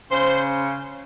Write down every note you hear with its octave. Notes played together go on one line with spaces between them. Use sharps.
C#3 C5